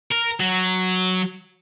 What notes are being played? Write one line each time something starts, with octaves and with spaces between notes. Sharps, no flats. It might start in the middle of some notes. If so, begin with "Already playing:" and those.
A#4
F#3